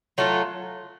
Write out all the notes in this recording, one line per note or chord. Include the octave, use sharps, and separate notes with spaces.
F#3 A3 F4